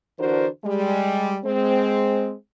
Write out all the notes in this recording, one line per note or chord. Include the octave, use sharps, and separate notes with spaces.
D3 E3 D4 F#4 A#4 C5
G3 G#3
G#3 C4